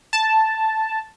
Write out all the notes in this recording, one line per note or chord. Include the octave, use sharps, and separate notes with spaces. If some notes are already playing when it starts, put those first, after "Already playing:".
A5